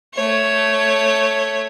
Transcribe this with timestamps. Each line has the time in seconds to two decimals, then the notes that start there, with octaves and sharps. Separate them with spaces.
0.14 A3 C#5